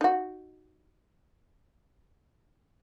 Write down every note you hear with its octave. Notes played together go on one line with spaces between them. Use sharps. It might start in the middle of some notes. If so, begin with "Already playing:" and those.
D#4 F#4